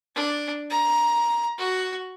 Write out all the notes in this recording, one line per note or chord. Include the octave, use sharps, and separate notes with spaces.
D4
A#5
F#4